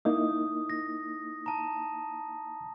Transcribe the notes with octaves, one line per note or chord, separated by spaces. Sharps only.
A#3 D#4 E4 D#6
A#6
A5 A#5